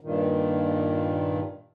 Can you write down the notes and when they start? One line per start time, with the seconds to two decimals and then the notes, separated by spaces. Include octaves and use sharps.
0.01 G2 A#2 D#3